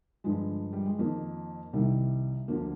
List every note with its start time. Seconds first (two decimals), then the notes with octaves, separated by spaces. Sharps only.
0.24 G2 D3 F3 G#3
0.73 G3
0.85 G#3
0.99 F2 D#3 A#3
1.73 C2 C3 D#3 G3
2.48 D2 D3 F3 A#3